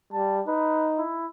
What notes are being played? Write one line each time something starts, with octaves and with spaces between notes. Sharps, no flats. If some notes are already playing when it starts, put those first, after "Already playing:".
G3 A5
D#4 B4
E4